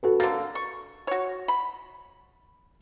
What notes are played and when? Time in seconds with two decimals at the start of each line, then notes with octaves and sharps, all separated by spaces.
0.03 F#4 A4 B4
0.20 D3 A#3 A6
0.55 C#6
1.07 F#4 C#5
1.48 B5